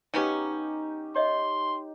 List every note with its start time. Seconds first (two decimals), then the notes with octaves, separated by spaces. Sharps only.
0.14 C#3 B3 C#4 D#4 G4
1.16 C#5 D#5 E5 C6